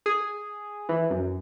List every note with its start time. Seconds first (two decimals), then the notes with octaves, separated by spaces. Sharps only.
0.06 G#4
0.89 E3
1.10 F#2